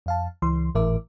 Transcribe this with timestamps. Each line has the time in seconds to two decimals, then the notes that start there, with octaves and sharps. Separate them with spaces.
0.06 F2 F5 A5
0.42 C#2 E3 C6
0.75 G#1 A2 E3 A#4 E5 D6